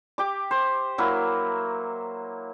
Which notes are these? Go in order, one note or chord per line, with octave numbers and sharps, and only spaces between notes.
G4 D6
C5
F#3 A#3 E4